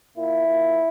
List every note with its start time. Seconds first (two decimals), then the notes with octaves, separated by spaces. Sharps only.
0.17 A#2 E4
0.48 A#2